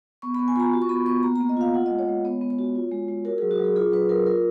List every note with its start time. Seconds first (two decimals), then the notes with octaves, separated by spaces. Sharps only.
0.22 B3 C#6
0.35 B5
0.39 B3
0.48 G#5
0.56 F4 A#5 B5
0.73 F#4
0.82 C#6
0.89 B3 B5
1.06 B3 C#6
1.23 A#3 A#5
1.36 A#5
1.40 A#3
1.49 D#5
1.57 F4 F5
1.74 F4 F#5
1.86 D#5
1.90 G#3
1.99 C#5
2.08 G#3
2.25 B3 C#5
2.41 B3
2.50 C#5
2.58 F#4
2.75 F4
2.91 G#3
3.08 G#3
3.25 F#4 A#4
3.38 F#3 G#4
3.51 F#4
3.59 F#3 G#4
3.76 F4 G#4
3.92 F#3 B4
4.09 F#3 A#4
4.26 F4 A#4